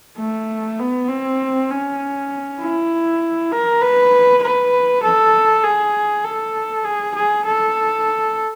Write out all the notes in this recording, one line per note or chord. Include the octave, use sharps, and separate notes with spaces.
A3
B3
C4
C#4
E4
A#4
B4
B4
A4
G#4
A4
G#4
G#4
A4